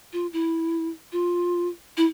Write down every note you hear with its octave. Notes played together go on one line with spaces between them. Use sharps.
F4
E4
F4
E4